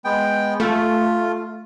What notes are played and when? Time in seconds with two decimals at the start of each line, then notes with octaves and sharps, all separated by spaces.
0.05 G#3 B3 G5
0.60 A3 F4